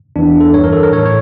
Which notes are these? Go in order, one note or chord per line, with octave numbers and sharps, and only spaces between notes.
E2 E3 D4
A4
G2 E3 C#5
A#4
A4
A#4
A2 E3 C#5
C#5